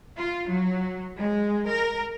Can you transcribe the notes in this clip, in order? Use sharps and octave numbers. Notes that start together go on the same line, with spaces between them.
F4
F#3
G#3
A#4